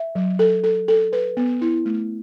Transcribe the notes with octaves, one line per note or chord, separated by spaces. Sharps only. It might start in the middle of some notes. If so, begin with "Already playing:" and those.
Already playing: E5
F#3
A4
A4
A4
B4
B3
E4
A3